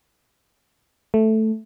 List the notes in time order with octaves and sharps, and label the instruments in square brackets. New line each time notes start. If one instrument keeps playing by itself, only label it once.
[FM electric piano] A3